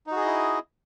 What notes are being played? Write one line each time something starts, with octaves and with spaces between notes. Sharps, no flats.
D#4 E4 F#4 G#4 D#5